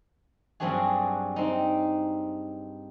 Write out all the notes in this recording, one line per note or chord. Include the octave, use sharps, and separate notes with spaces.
G2 F#3 C4 D4 F#4 G#4
C4 D#4